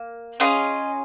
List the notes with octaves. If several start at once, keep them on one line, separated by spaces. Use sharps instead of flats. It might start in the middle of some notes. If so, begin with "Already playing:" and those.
Already playing: A#3
C#4 F4 G#4 D#5